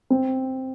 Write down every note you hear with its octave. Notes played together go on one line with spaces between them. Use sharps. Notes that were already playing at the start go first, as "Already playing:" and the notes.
C4